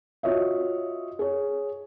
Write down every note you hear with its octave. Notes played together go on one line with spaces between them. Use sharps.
F4 F#4 C#5 D#5 E5
G#4 C#5